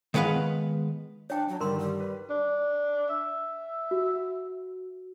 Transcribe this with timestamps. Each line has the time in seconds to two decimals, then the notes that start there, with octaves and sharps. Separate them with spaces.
0.14 D#3 G#3 B3 B4 F5
1.30 D4 C#5 G5
1.48 F#3
1.61 G2 D3 D#3 G3 A#4 C6
1.79 G3
2.00 B4
2.30 D4
3.09 E5
3.91 F#4